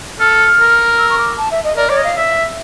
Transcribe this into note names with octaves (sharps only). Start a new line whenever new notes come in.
A4 F6
A#4
E6
C#6
D6
A5
E5
D#5
A#4 D5
C#5 D5
D#5
F5
E5